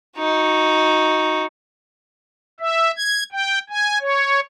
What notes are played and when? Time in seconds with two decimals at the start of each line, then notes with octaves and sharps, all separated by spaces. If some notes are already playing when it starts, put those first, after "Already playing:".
0.18 D#4 F#4
2.60 E5
2.97 G#6
3.32 G5
3.70 G#5
4.01 C#5